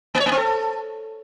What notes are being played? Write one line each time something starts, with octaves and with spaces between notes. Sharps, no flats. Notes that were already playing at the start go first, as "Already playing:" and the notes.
A#3
C#5
A#3
C4
A4